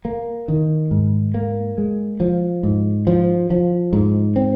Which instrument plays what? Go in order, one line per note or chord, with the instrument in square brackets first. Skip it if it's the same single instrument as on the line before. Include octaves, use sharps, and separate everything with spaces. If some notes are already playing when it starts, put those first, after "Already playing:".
[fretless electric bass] A#3
D#3
G#2
A#3
G#3
F3
G#2
F3
F3
G#2
C4